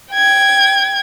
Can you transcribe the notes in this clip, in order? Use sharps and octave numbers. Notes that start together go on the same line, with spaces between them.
G5 G#6